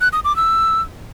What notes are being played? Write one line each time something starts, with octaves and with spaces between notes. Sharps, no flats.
F#6
D#6
D6
E6